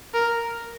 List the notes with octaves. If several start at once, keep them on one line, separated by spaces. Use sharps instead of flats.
A#4